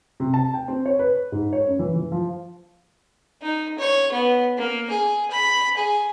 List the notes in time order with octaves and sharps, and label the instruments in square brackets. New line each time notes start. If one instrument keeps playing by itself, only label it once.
[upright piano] C3
A5
G5
C4
C#5
B4
G#2
C#5
F#2
E3
E3
F3
[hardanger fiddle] D#4
C#5
B3
A#3
G#4
B5
G#4